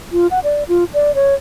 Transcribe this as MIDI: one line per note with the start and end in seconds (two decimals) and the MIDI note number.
0.12 0.27 65
0.31 0.40 78
0.44 0.64 74
0.68 0.84 65
0.94 1.15 74
1.15 1.35 73